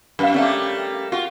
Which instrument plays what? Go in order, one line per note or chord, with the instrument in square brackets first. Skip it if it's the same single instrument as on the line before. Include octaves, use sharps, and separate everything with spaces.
[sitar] F#2 [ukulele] B4 F5
[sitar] G3 A3 A#3 [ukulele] C#4 D4 F5
[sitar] F4 [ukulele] F#4